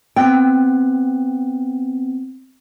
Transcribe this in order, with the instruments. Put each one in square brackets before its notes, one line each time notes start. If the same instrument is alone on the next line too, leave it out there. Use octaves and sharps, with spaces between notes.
[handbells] B3 C4 [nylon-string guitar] G5